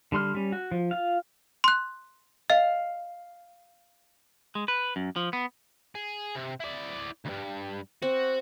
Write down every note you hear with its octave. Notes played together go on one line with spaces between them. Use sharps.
D3 G3 C6 F6
G3 C#4
F#4
F3
F4 F5
C6 F#6
D#5 F5
G#3
B4
F#2
F3
B3
G#4
C3
E4 D5
D2 G2
C4 F#4